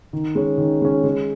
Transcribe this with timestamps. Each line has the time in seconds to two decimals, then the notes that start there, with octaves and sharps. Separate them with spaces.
0.13 D#3
0.35 G#3 C#4
0.58 D#3
0.82 G#3 C#4
1.04 G#3